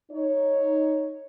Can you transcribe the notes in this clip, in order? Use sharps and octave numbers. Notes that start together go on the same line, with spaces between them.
D#4 C#5